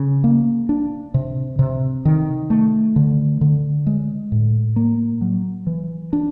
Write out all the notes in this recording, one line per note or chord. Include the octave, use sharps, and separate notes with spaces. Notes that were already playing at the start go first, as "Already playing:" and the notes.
Already playing: C#3
A#3
D4
C3
C3
D#3
A3
D3
D3
G#3
A2
A#3
F#3
E3
D4